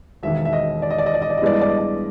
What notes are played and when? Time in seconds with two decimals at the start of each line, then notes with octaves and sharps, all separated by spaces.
0.23 E1 D#2 D#3 E5
0.45 E5
0.53 D#5
0.82 D5
0.90 D#5
0.98 D5
1.06 D#5
1.14 D5
1.22 D#5
1.30 D5
1.37 D#5
1.42 G2 E3 G#3 B3 E4 D5
1.53 D#5
1.61 D5
1.70 D#5
1.78 D5